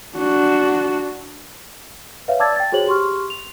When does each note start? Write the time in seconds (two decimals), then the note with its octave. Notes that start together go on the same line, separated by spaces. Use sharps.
0.17 D4 F#4
2.28 B4 C#5 E5 F5
2.39 D5 A5 D6 E6 G#6 A6
2.56 G5 A6
2.72 F#4 G#4 C5 C#5 F#7
2.87 G4 C6 C#6 F6
3.30 F7